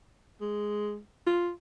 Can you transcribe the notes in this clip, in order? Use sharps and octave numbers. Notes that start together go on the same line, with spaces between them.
G#3
F4